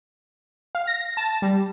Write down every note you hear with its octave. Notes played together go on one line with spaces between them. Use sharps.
F5
A#6
A5
G3